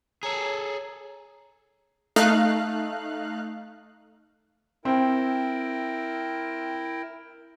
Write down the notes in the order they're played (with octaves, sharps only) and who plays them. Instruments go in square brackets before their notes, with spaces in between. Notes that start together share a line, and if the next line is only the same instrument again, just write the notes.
[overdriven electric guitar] G#4 A4 [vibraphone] C#5 A#5
[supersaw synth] A3 D#4 F5 F#6
[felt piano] C4 [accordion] E4 A#4 G5